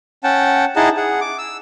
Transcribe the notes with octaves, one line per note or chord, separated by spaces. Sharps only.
C#4 F#5 G5 A5
D#4 E4 G#4 D#5 F#5 A5
G#4 F#5
D6
E6